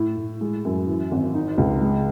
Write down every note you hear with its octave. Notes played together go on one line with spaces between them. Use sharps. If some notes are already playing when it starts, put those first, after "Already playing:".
Already playing: A2
A2
G#3
F#2
E3
G#1
D#4
C#2
G#3